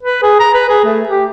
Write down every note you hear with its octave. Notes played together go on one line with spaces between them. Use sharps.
B4
G#4
A#5
B4
G#4
A3
G4